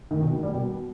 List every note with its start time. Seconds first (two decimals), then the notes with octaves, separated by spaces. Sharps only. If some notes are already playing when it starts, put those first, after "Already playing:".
0.11 D#3
0.22 B2
0.32 D#3
0.43 G3
0.54 B2